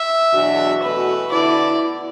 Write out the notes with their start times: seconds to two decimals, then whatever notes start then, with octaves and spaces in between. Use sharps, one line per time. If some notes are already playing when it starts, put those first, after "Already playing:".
Already playing: E5
0.33 E2 B2 F#3 D4 F#4
0.83 E2 B2 A3 F#4 B4
1.32 D3 B3 E4 D5